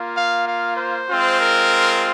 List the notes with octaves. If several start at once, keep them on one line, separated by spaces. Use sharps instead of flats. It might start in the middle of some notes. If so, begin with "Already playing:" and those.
Already playing: A#3 F4
F5
F5
C5
G#3 C4 F4
A#4